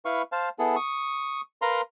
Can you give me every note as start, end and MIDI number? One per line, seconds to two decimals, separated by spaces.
0.05 0.22 64
0.05 0.22 71
0.05 0.22 77
0.05 0.22 85
0.32 0.49 72
0.32 0.49 77
0.32 0.49 81
0.59 0.76 59
0.59 0.76 64
0.59 0.76 68
0.59 0.76 69
0.76 1.41 85
0.76 1.41 87
1.62 1.81 70
1.62 1.81 71
1.62 1.81 77
1.62 1.81 82
1.62 1.81 84